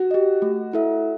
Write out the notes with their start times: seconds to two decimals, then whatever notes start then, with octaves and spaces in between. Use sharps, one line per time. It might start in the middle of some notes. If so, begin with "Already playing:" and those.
Already playing: F#4
0.11 G4 D#5
0.42 A3
0.73 E4 A4 E5